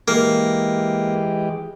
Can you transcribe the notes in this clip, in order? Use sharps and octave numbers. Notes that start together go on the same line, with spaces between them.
E3 G#3 A#3 G4